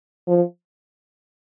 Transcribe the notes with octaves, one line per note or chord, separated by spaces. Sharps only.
F3